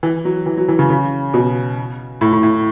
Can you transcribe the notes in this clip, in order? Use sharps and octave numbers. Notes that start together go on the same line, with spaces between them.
E3
F#3
E3
F#3
E3
C#3
C#3
B2
A2
A2
A2